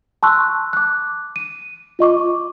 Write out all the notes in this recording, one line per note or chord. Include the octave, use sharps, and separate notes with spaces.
A5 C6 C#6 E6 F#6
D6 F#6
D#7
F4 D#5 C#6 D6